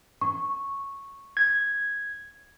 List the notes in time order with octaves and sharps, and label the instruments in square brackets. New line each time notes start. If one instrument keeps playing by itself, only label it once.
[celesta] C#6
[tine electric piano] G#6